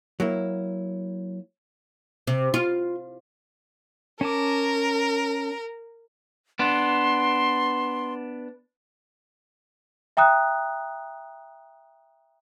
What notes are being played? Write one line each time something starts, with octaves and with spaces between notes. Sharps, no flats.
F#3 A#3 E4
C3
F4
C#4 A#4 A5 D6
B3 D4 C6
E5 G5 A#5 D#6 F#6